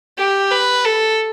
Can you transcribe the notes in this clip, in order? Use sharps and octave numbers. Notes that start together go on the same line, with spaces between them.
G4
B4
A4